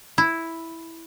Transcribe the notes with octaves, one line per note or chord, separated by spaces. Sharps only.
E4